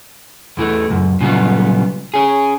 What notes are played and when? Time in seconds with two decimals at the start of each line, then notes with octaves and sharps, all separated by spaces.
0.57 E2 E3 A3
0.90 C#2 F#2
1.21 A#2 C#3 F#3 G3 B3
2.14 C#4 G#4